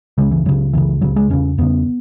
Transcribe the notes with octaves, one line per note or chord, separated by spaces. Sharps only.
C#2 C#3 G#3
E3
C#2 C#3 F#3
C#2 C#3 E3
C#2 C#3 F#3
G#3
E2 C#3 C#4
E2 C#3 B3